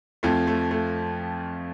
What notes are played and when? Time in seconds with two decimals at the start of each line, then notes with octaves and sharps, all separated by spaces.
0.23 F2 F3 A3
0.47 A3
0.71 A3